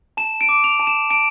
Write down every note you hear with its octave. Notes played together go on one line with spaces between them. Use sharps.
A5 E7
D7
D6
F7
A5
E7
A5 D7